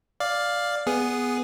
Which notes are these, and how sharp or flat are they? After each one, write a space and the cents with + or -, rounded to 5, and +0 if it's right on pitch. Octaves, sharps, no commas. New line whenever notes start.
D5 +0 F5 +5
B3 +0 G#4 +0